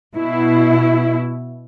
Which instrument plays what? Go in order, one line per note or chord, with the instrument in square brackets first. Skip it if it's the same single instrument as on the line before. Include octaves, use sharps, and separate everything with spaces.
[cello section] B2 E4